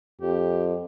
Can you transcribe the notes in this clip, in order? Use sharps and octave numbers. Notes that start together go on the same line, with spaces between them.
F2 G4